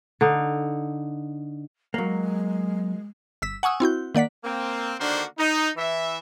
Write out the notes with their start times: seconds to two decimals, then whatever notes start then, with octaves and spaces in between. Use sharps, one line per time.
0.21 D3 D#4
1.94 F#3 G#3 A#3
3.42 G1 E6 B6
3.63 F#5 G#5 C#6 D#6 E6
3.80 C4 E4 F#4 G6
4.15 D#3 A#3 D5 F#5 B6
4.44 A#3 C4
5.00 D3 D#3 A#3 D4 F#4 C5
5.38 D#4
5.77 E3 E5